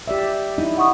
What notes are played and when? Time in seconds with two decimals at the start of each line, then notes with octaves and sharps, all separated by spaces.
0.08 G4 D5 E5
0.58 D#4 E4
0.78 F#5 C#6 D#6